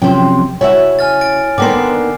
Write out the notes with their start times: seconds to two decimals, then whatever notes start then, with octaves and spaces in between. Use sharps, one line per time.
0.02 C3 F3 F#3 C4 C#4 G5
0.61 C#3 E4 F#4 C#5 E5
0.99 G#5 F6 A6
1.21 A6 D7
1.58 D3 D#3 A#3 B3 C5 D6 C7